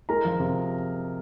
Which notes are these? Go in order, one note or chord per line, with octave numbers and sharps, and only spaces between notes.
G#3 A#4 A#5
F3
C3